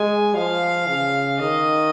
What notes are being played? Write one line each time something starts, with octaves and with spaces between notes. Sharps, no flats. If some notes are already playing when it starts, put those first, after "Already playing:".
Already playing: G#3 G#5
F3 F5
C#3
D#3 D#5